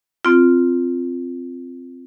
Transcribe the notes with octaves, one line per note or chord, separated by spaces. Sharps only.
C4 F4